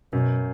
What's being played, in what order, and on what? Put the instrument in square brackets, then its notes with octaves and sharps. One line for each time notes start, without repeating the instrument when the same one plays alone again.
[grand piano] F#2 [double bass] B2